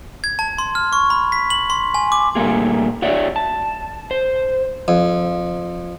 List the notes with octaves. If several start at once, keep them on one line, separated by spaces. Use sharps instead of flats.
G#6
A5
C6
F6
C#6
B5
B6
F#7
C6
G#5
D6
A#2 G3 A3 A#3 G#4
F#4 C#5 D5 E5
A5
C5
F2